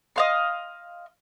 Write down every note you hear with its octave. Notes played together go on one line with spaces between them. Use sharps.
D#5 F5 C6